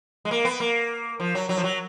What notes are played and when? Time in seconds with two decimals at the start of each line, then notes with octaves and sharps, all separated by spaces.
0.25 G#3
0.31 A#3
0.45 B3
0.60 A#3
1.20 F3
1.35 F#3
1.49 F#3
1.57 F3
1.64 F#3